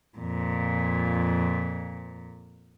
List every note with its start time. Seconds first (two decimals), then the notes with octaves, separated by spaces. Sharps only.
0.18 F2 A#2